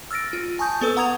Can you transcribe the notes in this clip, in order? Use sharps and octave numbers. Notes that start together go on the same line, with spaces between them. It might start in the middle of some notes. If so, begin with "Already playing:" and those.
E6 F6 A6 A#6 D7
F4
G#5 A5 C#6 D#6 G6
B3 A4 B4 E6
F#5 A#5 D#6 G#6 F7